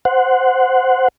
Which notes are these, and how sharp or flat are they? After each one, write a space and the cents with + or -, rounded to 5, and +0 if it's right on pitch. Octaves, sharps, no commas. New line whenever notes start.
C5 -10 F#5 +0